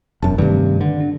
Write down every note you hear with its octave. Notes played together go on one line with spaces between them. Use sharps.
E1 F#2 A5
G2 C3 D#3 A3
D3
D4